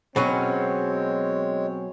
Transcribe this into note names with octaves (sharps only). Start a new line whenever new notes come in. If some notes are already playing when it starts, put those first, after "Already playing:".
B2 F#3 G#3 C4 C#4 C#5